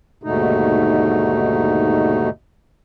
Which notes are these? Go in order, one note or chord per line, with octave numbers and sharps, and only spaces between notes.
D#2 G#2 B2 D3 A3 D#4